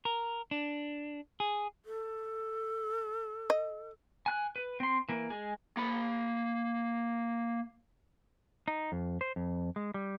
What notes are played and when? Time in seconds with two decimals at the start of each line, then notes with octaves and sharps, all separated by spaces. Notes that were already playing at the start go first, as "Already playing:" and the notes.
0.05 A#4
0.51 D4
1.40 G#4
1.85 A4
3.50 D#5
4.26 G#5 F#6
4.56 B4
4.80 C4 C6
5.09 E3 A#3
5.30 G#3 G#4
5.77 A#3 B5
8.68 D#4
8.92 F2
9.21 C5
9.36 F2
9.76 G#3
9.94 G3